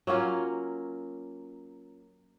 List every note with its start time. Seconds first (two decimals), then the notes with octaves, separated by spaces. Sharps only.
0.07 F#3 A#3 C#4 F4